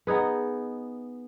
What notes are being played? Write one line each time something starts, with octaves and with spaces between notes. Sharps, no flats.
B3 D#4 G#4 B4